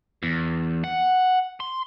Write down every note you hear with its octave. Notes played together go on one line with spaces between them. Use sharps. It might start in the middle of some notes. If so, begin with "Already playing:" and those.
E2
F#5
C6